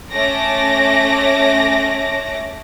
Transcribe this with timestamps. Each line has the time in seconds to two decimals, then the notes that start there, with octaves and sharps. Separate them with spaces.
0.12 A3 C#4 D6 A#6